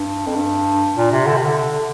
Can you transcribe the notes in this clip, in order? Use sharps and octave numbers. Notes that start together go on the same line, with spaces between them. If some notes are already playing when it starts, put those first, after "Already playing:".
Already playing: G2
F2
G2
A#2
C3
D3
C3
D3